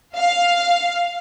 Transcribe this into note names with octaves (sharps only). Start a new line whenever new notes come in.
F5